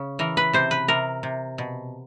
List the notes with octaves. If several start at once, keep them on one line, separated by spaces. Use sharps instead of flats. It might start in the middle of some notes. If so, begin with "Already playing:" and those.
Already playing: C#3
E3 A#4
B4
C3 C5
B4
C3 A#4
C3
B2